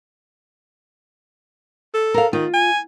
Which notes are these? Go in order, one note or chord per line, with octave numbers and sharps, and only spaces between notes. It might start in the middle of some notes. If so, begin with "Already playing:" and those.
A4
A#4 F5
D#3 F4
G#5